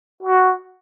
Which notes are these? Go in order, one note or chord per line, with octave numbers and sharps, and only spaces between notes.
F#4